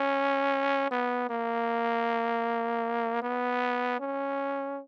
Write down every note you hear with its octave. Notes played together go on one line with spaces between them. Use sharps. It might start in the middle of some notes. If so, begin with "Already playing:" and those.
Already playing: C#4
B3
A#3
B3
C#4